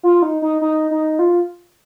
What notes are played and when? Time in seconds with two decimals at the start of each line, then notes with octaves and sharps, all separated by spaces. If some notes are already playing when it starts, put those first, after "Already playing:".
0.03 F4
0.22 D#4
0.42 D#4
0.61 D#4
0.91 D#4
1.19 F4